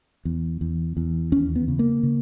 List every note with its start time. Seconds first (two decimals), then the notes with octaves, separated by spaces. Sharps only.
0.25 E2
0.61 E2
0.97 E2
1.32 D#2 C#4
1.56 B3
1.68 C#3
1.79 A#3
2.03 C#3